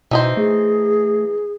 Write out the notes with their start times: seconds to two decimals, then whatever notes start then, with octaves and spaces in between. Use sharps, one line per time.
0.11 B2 E3 D#4 C5
0.37 A3 G#4